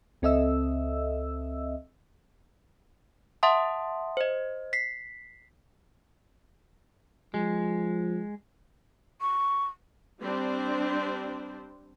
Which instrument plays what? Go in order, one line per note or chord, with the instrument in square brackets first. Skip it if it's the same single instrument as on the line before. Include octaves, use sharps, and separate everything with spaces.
[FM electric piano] C#2 C4 A4 D#5 E5 E6
[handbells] E5 F#5 A5 C6 D#6
C5 D#5
B6 C7
[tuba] F3 [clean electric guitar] G#3
[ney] C#6
[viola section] G3 C4 D4 C5